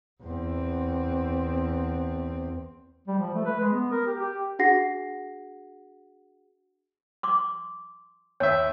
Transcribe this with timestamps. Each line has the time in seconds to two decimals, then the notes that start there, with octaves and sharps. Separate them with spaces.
0.23 E2 C4
3.08 G3
3.19 F3
3.34 A3
3.46 B4
3.60 G#3
3.73 B3
3.91 A#4
4.06 G4
4.18 G4
4.59 D4 F#4 G#4 F#5 A#6 C7
7.23 C6 D6
8.40 D#2 C#5 E5